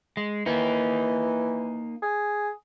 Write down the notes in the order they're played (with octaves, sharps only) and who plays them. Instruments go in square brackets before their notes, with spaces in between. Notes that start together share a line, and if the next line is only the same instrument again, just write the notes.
[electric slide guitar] G#3
[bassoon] E3 [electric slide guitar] A#3 D#4
[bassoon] G#4